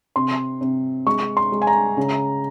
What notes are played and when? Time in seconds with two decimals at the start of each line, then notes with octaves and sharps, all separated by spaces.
0.16 C3 C6
0.61 C3
1.06 G#3 C#6
1.37 C6
1.52 G#3
1.62 G#5
1.67 A#5
1.97 C#3